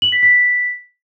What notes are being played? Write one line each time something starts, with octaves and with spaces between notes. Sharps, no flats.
F#7
B6
B6